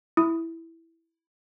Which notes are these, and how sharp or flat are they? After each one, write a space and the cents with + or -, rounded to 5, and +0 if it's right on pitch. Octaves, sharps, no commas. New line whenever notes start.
E4 +0 D#6 +5